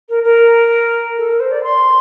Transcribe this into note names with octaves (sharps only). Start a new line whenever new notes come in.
A#4
A#4
A4
A#4
C5
D5
C6